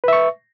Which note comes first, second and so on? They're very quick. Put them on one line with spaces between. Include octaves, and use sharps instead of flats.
B4 E5 C#6